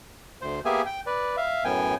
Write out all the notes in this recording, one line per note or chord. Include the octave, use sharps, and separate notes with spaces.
D2 C5
A#3 B3 G4 G#4 E5 G#5
G5
B4 D5
E5 F5
F#2 A2 B3 G5 G#5